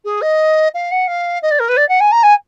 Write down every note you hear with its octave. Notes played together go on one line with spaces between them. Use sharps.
G#4
D#5
F5
F#5
F5
D#5
D5
A#4
B4
D5
F#5
G#5
A#5
G#5